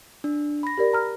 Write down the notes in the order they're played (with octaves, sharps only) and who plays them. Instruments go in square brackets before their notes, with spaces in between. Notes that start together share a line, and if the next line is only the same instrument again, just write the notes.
[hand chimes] D4
B5 A#6
[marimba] G4 A#4 D5
A#5 F6